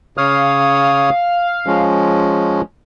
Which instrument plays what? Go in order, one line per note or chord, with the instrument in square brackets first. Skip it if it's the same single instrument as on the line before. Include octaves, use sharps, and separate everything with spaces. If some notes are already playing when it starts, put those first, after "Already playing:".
[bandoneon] C#3 C#5 D#6 [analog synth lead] F5
[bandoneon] F3 G#3 C#4